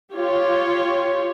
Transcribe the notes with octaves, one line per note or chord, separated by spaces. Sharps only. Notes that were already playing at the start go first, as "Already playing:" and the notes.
F4 G4 C#5